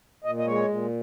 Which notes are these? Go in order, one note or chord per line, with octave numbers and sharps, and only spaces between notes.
A#2 D#5
D#5
G#3 C#5
A#2